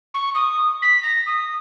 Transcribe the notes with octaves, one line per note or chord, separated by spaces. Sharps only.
C#6
D#6
B6
A#6
D#6